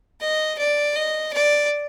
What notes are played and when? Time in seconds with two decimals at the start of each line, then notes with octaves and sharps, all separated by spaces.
0.20 D#5
0.58 D5
0.95 D#5
1.33 D5